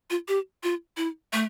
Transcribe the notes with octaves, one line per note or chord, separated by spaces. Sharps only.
F4
G4
F4
E4
A3